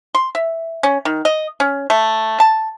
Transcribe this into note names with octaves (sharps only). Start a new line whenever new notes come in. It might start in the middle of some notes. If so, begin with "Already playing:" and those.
C6
E5
C#4
D#3
D#5
C#4
A3
A5